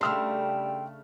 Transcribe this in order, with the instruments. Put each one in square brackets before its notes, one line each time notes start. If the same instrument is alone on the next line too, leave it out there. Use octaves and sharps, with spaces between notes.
[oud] C#3 A3 D4 [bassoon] G3 [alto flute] G5 [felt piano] C6 E6 F6